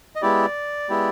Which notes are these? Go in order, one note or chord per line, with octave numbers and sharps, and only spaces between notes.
D#5
G#3 B3 E4 G4 D5
G#3 B3 E4 G4